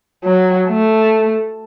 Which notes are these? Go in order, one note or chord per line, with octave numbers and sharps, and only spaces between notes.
F#3
A3